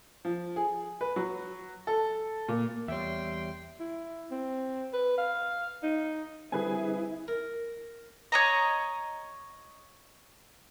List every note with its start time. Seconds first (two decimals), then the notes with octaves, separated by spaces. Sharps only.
0.25 F3
0.56 G#4
1.01 B4
1.16 F#3
1.87 A4
2.48 A#2
2.88 E2 G3 C#5 E5 G5 C6
3.80 E4
4.31 C4
4.94 B4
5.18 F5
5.83 D#4
6.52 D3 G3 C4 E4 G#4 B4 G#5
7.28 A#4
8.32 C#5 D#5 A#5